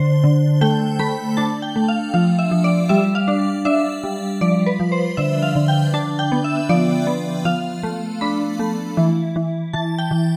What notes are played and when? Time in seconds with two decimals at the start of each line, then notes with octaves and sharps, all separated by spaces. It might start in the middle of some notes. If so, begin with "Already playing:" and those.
Already playing: D3 C5
0.24 D3
0.61 A3 G5
0.99 A3 B5
1.37 D4 A5
1.62 G5
1.76 A3
1.88 F5
2.14 F3 F5
2.39 E5
2.51 F3
2.64 D5
2.89 G3 E5
3.15 F5
3.28 D4
3.65 D4 E5
4.04 G3
4.41 F3 D5
4.66 B4
4.80 F3
4.92 C5
5.17 D3 E5
5.42 F5
5.55 D3
5.68 G5
5.94 D4 A5
6.19 G5
6.32 B3
6.44 E5
6.69 F3 D5
7.07 B3
7.45 F3 F5
7.83 A3
8.21 D4 B5
8.59 A3
8.97 E3
9.36 E3
9.73 E3 A5
9.98 G5
10.11 E3